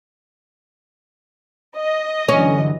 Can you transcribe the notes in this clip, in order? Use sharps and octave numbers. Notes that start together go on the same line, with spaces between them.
D#5
G2 D3 E3 F#3 C#4